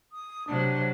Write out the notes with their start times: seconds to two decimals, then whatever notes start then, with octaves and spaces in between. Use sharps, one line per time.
0.12 D#6
0.47 C3 F#3 D4